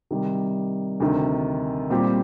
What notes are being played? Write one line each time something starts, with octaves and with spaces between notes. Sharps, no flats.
C3 D#3 G3
D2 C3 D#3
A#2 G3 C4 G4